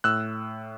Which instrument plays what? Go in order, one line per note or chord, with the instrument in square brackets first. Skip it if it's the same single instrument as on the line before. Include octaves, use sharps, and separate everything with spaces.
[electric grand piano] A2 E6 F#6